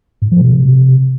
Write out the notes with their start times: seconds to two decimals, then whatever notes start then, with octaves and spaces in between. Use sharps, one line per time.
0.22 G#2
0.32 F3
0.41 B2
0.51 C3